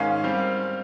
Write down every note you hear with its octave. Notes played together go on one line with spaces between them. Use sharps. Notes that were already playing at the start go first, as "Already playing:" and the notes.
Already playing: G#2 D#3 G#3 C#4 F5
G3 C4